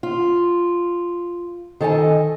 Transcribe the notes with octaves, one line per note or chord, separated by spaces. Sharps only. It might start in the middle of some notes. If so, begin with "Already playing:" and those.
F4
D#3 A4 D#5 G#5